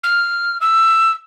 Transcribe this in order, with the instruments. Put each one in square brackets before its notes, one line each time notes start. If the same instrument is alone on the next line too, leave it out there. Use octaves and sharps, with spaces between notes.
[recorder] F6
E6